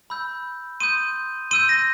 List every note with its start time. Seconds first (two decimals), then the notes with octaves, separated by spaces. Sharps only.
0.10 B5 E6 G6
0.80 C6 D#6 G6 D#7
1.51 C6 E6 G6 D#7
1.69 A#6